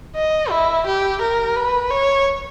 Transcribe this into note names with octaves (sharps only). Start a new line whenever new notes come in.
D#5
E4
G4
A#4
B4
C#5